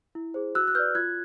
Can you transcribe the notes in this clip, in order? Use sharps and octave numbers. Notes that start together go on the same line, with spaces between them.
E4
G#4 C5
F#4 E6 F#6
F#6
B4 D5 F6 G6
F4 F#6 G#6